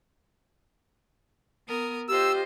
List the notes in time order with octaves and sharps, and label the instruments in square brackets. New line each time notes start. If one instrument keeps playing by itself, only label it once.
[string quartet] B3 A#4 D#6
[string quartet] F4 C5 D#5 [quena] G4 [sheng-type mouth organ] E6